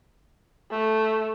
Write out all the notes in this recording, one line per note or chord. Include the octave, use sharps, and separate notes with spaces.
A3